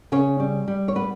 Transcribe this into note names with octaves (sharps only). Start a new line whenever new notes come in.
C#3 C#4 C#5
G3
G3
C#5
G3 B3 B4